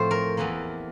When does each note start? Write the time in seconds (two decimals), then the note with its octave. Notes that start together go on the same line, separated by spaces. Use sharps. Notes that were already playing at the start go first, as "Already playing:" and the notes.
Already playing: A2 F3 A3 C4 C5
0.11 A#4
0.37 E2 E3 A#3